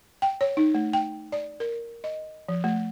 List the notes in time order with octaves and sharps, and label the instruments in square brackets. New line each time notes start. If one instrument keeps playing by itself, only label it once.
[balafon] G5
C#5
D#4
A3
G5
D5
A#4
D#5
F3
A3